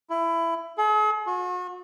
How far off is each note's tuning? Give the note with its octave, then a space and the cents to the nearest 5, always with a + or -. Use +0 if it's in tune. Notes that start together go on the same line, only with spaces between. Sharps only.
E4 +20
G#4 +45
F#4 -40